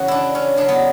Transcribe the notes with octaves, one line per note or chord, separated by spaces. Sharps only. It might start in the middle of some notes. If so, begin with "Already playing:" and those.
Already playing: C#3 E3 F#4
D4 E4
C#4
C#3 F#3 D4
B3